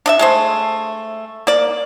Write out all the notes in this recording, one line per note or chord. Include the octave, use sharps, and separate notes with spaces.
D4 D#5 E5
G#3 A3 C5
A#3 D5